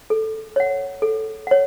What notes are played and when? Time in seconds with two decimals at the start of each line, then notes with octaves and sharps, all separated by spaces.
0.10 A4
0.56 C#5 F#5
1.02 A4
1.47 C#5 F#5